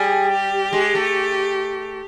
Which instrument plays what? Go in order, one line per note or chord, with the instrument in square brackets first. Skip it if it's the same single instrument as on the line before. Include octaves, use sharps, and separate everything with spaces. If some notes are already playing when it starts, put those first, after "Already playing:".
Already playing: [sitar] G3 [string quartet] G#4
[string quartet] G4
[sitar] G#3
A3